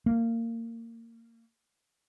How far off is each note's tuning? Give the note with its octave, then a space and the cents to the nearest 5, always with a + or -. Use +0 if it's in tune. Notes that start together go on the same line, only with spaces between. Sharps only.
A#3 -25